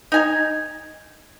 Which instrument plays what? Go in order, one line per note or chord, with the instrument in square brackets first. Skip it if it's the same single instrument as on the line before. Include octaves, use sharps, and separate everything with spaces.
[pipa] D#4 G#5 A#5